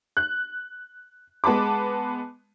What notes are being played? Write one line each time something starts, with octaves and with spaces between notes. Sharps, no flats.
F#6
G#3 B3 A5 B5 D6